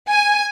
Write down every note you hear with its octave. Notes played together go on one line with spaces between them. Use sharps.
G#5